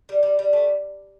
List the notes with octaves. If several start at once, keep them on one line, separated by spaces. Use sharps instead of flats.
G3
G3
G3
A3